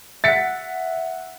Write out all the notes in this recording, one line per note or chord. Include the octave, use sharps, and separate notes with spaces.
E5 F#5 A6 B6 C#7